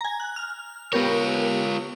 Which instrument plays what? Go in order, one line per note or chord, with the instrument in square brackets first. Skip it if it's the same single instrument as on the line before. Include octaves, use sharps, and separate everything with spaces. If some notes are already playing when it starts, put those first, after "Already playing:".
[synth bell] G#5 A#5
F#6
F6
[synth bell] B3 G4 A#4 [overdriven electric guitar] F4 C#5